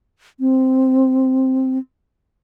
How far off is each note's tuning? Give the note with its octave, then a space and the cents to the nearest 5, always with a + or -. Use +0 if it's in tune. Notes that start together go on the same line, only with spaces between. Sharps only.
C4 +0